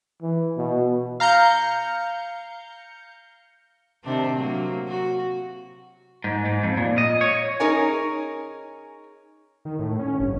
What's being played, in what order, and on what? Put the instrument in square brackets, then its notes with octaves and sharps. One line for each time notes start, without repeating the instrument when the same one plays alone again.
[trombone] E3
B2
[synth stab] F5 A#5 G6 C#7
[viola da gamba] C3 D#3 D4
F#3 A#3
F#4
[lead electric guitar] G#2
G#2
F2
A#2
D#5
C#5
[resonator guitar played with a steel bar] C#4 D#4 G#4 A#4 C#5 G#5
[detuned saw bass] D#3
A2
C#4
G1